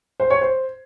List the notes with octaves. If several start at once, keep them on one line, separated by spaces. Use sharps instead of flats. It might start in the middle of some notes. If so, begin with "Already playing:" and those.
C5
C#5
C5